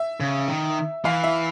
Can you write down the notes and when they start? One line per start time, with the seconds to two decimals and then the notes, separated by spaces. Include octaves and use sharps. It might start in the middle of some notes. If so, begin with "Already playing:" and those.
Already playing: E5
0.20 C#3
0.48 D#3
1.05 E3 F5
1.24 E5